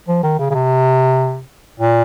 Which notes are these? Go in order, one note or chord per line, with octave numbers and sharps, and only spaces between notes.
F3
D#3
C#3
C#3
C3
A#2